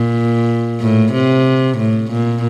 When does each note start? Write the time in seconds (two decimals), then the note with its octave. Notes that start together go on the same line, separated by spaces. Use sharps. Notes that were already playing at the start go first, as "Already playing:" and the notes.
Already playing: A#2
0.80 A2
1.12 C3
1.78 A2
2.11 A#2